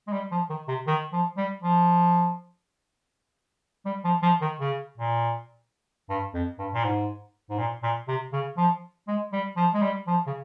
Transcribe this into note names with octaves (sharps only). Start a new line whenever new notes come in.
G#3
G3
F3
D#3
C3
D#3
F3
G3
F3
G3
F3
F3
D#3
C#3
A#2
G2
F2
G2
A#2
G#2
G#2
A#2
A#2
C3
C#3
F3
G#3
G3
F3
G#3
G3
F3
C#3